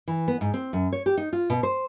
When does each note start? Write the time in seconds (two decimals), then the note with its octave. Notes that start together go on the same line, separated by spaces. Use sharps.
0.08 E3
0.28 B3
0.41 G#2
0.54 C4
0.73 F#2
0.93 C#5
1.06 G4
1.17 D#4
1.33 F4
1.50 B2
1.63 C5